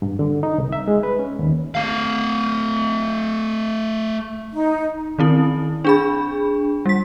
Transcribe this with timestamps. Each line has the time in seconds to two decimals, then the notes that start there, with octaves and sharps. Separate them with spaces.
0.02 G2
0.19 D3
0.43 D#4
0.58 C2
0.72 E5
0.88 G#3
1.03 B4
1.19 C#4
1.39 D#2
1.75 A3 F5
4.53 D#4
5.19 D#3 C4 E4
5.85 D4 G#4 B5
6.86 G3 B6